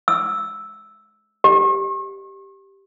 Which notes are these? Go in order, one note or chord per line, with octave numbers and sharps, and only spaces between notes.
E6
G4